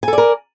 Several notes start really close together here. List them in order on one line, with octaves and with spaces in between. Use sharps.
G#5 A4 D5 A#4